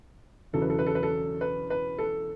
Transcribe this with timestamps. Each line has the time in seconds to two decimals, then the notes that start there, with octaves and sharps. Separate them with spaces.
0.53 E1 E2 C#3 F#3 A4
0.62 B4
0.70 A4
0.79 B4
0.86 A4
0.95 B4
1.03 A4
1.41 B4
1.70 B4
1.99 A4